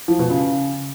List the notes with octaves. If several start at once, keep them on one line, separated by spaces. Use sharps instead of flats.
F3
B2
C#3